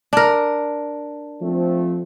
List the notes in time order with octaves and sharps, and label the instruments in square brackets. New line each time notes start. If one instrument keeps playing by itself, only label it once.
[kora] D4 A#4
[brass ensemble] F3 A3 C4